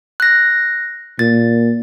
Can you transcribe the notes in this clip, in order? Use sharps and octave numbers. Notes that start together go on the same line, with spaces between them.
F#6 A#6
A#2 A6